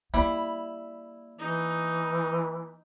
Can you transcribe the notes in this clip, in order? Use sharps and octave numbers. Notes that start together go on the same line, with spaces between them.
G3 A#3 E4
E3 D#4